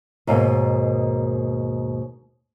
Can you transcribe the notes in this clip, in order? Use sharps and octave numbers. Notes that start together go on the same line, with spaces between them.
D#2 G#2 B2 A#3